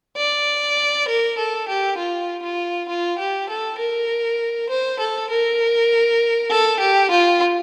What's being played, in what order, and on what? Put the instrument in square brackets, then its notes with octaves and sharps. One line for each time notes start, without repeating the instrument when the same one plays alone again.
[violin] D5
A#4
A4
G4
F4
F4
F4
G4
A4
A#4
C5
A4
A#4
A4
G4
F4